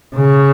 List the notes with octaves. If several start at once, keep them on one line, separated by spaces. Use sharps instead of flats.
C#3